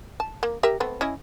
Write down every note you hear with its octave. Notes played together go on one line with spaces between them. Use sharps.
A5
A#3
G4 A#4 E5
A3 B3 C4
C#4 E4 D#5